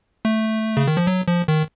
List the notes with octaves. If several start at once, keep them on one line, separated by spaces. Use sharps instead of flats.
A3
C#3
D#3
F3
F#3
F3
D#3